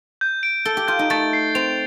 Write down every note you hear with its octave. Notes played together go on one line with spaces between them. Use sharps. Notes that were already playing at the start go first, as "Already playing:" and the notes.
G6
D7
A4 G7
G4
F4 G6
D#4
A3 A6
C7
C4 F7